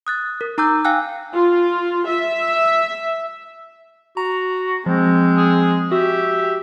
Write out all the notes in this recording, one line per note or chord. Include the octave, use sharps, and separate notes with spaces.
D#6 F#6 A6
A#4
D#4 A#5 D6 E6 G6
F5 G5 G#5 E6 F#6
F4
E5
F#4 A#5
F3 G#3 C4
G#4
F#4 G4 E5